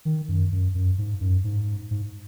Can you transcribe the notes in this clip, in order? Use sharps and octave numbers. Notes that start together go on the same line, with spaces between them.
D#3
F#2
F#2
F#2
G#2
F#2
G#2
G#2